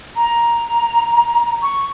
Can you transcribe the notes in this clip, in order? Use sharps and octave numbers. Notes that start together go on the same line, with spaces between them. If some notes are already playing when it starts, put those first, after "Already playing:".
A#5
C#6